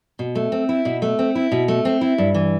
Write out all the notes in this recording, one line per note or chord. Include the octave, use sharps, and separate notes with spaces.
B2
A3
C4
E4
B2
A3
C4
E4
B2
A3
C4
E4
G2
E3